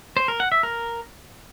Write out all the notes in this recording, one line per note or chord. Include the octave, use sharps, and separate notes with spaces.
C5
A#4
F#5
E5
A#4